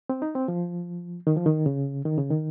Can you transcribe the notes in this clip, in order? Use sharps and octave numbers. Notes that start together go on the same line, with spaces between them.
C4
D#4
C4
F3
D#3
F3
D#3
C#3
D#3
C#3
D#3